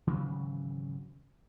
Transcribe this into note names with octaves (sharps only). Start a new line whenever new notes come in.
G#1 C#3 E3 F#3